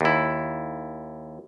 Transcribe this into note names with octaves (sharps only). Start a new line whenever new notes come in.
D#2 E4